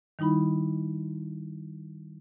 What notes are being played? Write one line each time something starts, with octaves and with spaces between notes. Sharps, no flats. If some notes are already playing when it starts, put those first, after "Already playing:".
D#3 G3 D#4 E4 B5